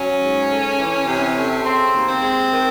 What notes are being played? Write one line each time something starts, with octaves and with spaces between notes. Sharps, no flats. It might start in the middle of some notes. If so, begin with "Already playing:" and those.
Already playing: F#3 C#4
G#2
A3
E3
C3
A3
C#3 C4
D#2
C4
G#3
D#3